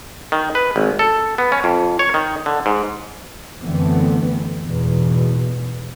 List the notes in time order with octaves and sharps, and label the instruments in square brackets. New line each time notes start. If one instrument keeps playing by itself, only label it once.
[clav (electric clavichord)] D#3
B4
G#1
A4
B3
C#4
F2
C#5
D#3
D3
G#2
[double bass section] F#2 D3 E3 A3 B3 C4
E2 G#2 B2